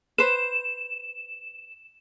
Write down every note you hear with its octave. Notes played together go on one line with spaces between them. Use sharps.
B4 C5 E7